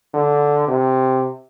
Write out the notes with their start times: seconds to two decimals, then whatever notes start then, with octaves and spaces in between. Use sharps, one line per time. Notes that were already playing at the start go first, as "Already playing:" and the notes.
0.14 D3
0.68 C3